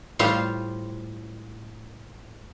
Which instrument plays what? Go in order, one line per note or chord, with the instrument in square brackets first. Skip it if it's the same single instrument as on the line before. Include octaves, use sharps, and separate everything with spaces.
[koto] A2 G3 F4 C5 F5